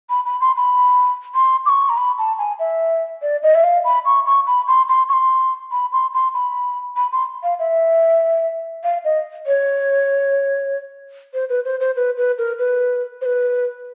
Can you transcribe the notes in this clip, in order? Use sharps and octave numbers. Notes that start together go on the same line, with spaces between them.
B5
B5
C6
B5
C6
D6
C#6
A#5
B5
A5
G#5
E5
D5
D#5
E5
F5
B5
C#6
C#6
B5
C6
C6
C#6
C6
B5
C6
C6
B5
B5
C6
F5
E5
F5
D#5
C#5
C5
B4
C5
C5
B4
B4
A#4
B4
C5
B4